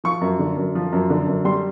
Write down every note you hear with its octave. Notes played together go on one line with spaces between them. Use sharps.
F3 C#6
F#2
D3
F#2
F3
F#2
D3
F#2
G3 C6